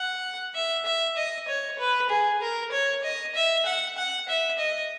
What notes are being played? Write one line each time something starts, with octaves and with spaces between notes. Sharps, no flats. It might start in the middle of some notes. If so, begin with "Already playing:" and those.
Already playing: F#5
E5
E5
D#5
C#5
B4
G#4
A#4
C#5
D#5
E5
F#5
F#5
E5
D#5